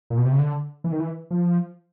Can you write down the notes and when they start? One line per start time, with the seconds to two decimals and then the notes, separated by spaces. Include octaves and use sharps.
0.10 A#2
0.18 B2
0.25 C3
0.32 C#3
0.39 D3
0.84 E3
0.92 D#3
1.00 E3
1.31 F3